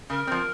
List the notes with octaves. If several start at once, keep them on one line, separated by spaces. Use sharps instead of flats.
C#3 A#4
F3 C4